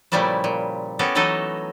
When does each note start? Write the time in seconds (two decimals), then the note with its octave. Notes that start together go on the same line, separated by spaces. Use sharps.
0.12 A#2 C#3 F3 G3 A3 E4
0.44 A#2
0.99 B3 C#4 F#4 G4 A4
1.15 E3 F#3 A3 D#4 A4 D#5